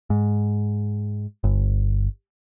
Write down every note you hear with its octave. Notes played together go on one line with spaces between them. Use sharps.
G#2
G1